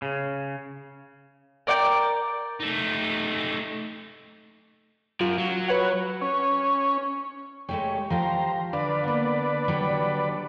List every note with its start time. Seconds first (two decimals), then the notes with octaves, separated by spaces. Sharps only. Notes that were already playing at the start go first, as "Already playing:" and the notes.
0.02 C#3
1.67 A#4 D5 F#5 G5
2.60 A3 D#4
5.21 F#2 F4
5.39 F#3
5.68 B4 C#5 F#5
6.22 C#4
7.69 G#3 A3 G4 C#5
8.10 F3 G4 C5 F5 A#5
8.73 D3 B4 D5 F5
9.04 A#3 B3
9.68 F#3 G3